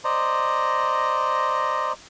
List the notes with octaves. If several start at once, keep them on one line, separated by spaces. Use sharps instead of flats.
C5 D5 D#5 A#5